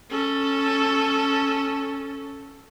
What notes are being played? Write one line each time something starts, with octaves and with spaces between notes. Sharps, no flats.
C#4 A4